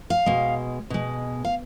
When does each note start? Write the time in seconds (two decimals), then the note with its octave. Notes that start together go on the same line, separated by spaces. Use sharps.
0.10 F5
0.26 B2 G#3
0.90 B2 G#3
1.45 F5